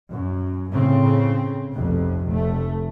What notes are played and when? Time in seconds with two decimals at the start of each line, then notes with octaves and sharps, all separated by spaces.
0.10 F#2
0.72 A2 C#3 C4
1.74 F1 B1 F2 C3
2.28 F1 A3